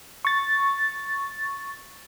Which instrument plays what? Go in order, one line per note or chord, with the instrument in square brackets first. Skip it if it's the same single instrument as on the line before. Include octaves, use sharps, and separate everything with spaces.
[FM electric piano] C#6 A6